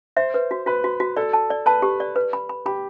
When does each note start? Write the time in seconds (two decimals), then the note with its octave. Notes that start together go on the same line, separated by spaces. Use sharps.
0.17 C5 E5
0.34 B4
0.51 F#4
0.66 F#4 B4
0.84 F#4
1.00 F#4
1.16 A4 D5
1.33 A5
1.50 D5
1.66 B4 A5
1.82 G4
2.00 D5
2.16 B4
2.33 B5
2.49 B5
2.66 G4 B5